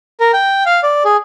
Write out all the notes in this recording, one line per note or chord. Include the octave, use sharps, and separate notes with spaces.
A#4
G5
F5
D5
G#4